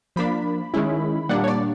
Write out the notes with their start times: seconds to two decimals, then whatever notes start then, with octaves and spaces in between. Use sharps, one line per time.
0.16 F3 A#3 D4 B5
0.74 D#3 G#3 C#4 E4
1.29 A#2 G3 A#3 D4 F#5
1.44 C#5
1.48 D5